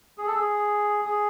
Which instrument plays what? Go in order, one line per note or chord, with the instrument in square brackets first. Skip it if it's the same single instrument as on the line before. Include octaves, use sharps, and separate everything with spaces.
[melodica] G#4
A4
G#4
G#4